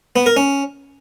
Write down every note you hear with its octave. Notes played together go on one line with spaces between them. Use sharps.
B3
A#4
C#4